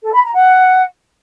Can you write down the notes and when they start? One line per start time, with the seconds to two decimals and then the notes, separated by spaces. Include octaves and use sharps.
0.04 A4
0.13 B5
0.23 A#5
0.33 F#5